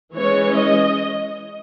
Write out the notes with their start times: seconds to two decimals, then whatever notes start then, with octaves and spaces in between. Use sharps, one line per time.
0.15 E3 G#3 C#4 C#5
0.56 D#5